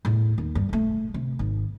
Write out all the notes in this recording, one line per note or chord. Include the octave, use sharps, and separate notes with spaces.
E2 A2
D#2
G2
E1 A3
C3
G#1